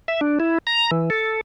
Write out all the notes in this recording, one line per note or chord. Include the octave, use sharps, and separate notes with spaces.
E5
D4
E4
A#5
E3
A4